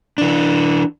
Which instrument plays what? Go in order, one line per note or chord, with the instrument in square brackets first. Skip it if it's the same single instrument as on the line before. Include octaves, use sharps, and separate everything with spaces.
[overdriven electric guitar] E3 D4